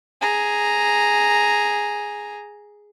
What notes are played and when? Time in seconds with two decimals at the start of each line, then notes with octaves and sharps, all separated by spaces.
0.21 G#4 A#5